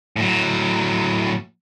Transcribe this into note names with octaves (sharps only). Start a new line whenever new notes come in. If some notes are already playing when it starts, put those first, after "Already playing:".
A2 F#3